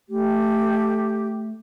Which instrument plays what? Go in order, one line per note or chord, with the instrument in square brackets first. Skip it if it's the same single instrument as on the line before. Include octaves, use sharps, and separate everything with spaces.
[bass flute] A3 [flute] G4